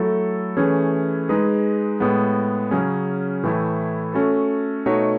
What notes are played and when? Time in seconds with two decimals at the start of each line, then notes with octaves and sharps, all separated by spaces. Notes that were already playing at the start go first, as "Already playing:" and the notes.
Already playing: F#3 A3 E4 A4
0.57 E3 A3 C#4 G#4
1.29 G#3 D#4 G#4 B4
2.00 A2 G#3 B3
2.71 C#3 F#3 C#4 G#4
3.43 A2 E3 A3 E4
4.14 A3 C#4 F#4 A4
4.86 B2 A3 D#4 F#4 C#5